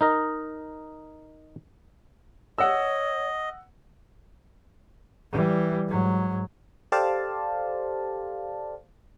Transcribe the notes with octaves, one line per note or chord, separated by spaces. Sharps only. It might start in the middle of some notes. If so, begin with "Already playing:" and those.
D#4 A#4 D#5
C#5 D#5 F#5 E6
E3 G3
G#2 F#3
G4 A4 C5 D5 F5 A5